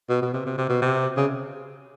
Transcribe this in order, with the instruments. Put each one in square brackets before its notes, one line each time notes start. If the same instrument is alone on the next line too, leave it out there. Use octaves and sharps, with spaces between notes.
[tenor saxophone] B2
B2
C3
C3
C3
B2
C3
C#3